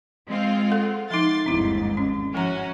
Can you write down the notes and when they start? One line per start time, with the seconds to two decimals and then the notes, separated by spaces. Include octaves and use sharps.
0.27 G#3 C4 F4
0.70 A4 F#5
1.10 F3 D#4 C6 A6
1.46 G1 D#2 G#2 C4 E4
1.97 C#4
2.34 F3 C#4 F#4 A#5